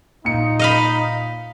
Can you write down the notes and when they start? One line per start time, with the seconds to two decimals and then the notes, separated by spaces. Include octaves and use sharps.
0.25 A#2 D#4 C#7
0.59 D#5 F5 B5